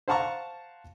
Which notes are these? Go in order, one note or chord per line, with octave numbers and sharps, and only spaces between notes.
C5 F5 F#5 A5 A#5 C#6